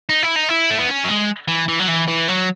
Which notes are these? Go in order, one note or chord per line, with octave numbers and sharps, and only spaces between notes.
D#4
E4
D#4
E4
A3
B3
C#4
F#3
G#3
E3
E3
F#3
E3
E3
F#3